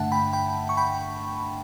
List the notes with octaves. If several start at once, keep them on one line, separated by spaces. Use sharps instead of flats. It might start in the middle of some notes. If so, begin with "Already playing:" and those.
Already playing: G2 D3 A3 D4 E5 F#5 A5
G5 B5
G5 B5
C#6
G5 B5